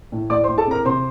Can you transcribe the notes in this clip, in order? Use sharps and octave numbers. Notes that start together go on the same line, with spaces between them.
A2
A2 D5 D6
C5 C6
A2
A4 A5
C4 A#4 A#5
C3 C5 C6